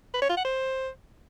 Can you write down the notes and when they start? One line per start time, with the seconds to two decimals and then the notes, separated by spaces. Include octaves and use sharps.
0.14 B4
0.22 C#5
0.29 F4
0.37 F#5
0.45 C5